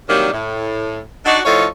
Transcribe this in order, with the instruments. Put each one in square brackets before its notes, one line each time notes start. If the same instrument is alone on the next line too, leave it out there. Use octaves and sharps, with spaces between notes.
[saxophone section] C3 D#3 F#3 G3 A#3 D4
A2
D4 D#4 F#4
A2 F3 D#4 A4 C#5 F5